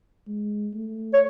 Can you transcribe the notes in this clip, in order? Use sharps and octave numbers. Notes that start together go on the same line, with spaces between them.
G#3
A3
C#5